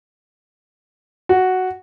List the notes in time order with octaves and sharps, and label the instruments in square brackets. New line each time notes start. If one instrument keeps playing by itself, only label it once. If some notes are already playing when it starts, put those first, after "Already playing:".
[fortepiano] F#4